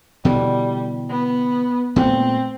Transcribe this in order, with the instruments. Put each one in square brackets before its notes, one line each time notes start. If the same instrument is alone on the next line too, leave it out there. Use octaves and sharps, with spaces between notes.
[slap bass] B2 D3 E3 [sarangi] G3
[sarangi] B3
[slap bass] A#2 A3 B3 [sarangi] C4